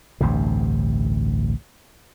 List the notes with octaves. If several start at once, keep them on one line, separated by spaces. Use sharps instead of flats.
A1 D2 G2 C3